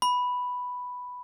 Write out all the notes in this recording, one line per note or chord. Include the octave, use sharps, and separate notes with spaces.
B5